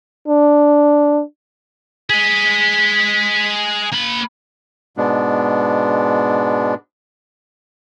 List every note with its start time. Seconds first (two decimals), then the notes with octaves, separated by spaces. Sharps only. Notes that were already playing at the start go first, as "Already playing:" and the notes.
0.28 D4
2.10 G#4 D#5 B6
3.93 A#3 B5
4.97 G#2 B2 G#3 B3 D4